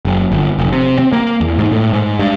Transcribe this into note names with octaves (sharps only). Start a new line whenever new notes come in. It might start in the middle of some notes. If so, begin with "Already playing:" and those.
F#1
G1
F1
C3
C4
A#3
E2
G#2
A2
G#2
G2